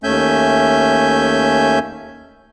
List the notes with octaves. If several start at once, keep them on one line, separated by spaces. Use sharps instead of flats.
D#2 A3 C#4 E5 G#5 G6